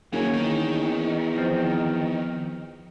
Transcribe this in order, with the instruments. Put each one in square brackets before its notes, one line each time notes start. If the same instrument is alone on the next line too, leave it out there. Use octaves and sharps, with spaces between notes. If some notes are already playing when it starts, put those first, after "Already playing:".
[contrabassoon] F#1 [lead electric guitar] D#2 G#4 [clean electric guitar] A#3 C#4
[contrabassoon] E2 [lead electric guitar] D#3
[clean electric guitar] F3 C4